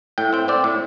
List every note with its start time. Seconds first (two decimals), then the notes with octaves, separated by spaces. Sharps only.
0.18 A2 G5
0.33 C4 G5
0.48 C4 D5
0.64 A2